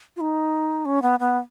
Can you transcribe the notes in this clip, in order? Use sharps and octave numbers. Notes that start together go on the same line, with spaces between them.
F4
D#4
C#4
B3
B3